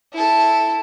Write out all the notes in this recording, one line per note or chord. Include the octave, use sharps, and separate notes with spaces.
E4 A4